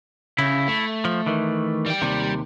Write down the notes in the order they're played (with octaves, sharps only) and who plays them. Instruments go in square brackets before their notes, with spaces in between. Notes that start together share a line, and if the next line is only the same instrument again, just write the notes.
[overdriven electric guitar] C#3 [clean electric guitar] E4
[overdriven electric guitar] A3
[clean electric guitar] F3
D#3 E3
[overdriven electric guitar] G3 G5
[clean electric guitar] D#2 C3